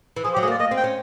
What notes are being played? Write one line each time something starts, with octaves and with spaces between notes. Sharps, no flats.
E3
F3 G#4
G4
F#3
A3 G#4
A#3
D5
A#3 D#5
C4
G5
C#4